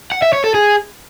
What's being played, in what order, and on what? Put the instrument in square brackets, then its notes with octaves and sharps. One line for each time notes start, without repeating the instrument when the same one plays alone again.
[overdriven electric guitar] F#5
E5
C#5
A4
G#4